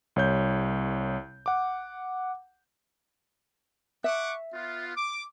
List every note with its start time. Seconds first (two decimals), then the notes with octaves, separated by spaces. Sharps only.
0.16 C2 C#5 G6
1.46 F#5 D6
4.04 E5 F#5 C#6 D6
4.54 B3 F4
4.95 D6